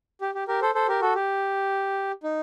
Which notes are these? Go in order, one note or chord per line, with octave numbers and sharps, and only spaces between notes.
G4
G4
G4 A#4
A4 C5
A4 C5
G4 A#4
F#4 A4
G4
D#4